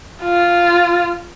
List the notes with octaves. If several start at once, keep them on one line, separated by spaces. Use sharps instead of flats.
F4